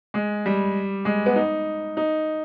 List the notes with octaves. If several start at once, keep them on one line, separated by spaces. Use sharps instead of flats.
G#3
G3
G#3
B3
D#4
D#4